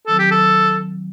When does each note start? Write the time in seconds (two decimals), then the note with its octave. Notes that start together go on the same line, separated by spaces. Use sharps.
0.07 D#3 F#3 C4 A4
0.19 G4
0.31 A4